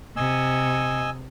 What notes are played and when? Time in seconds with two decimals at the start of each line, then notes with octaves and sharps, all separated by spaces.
0.17 C3 D#5 G#5 E6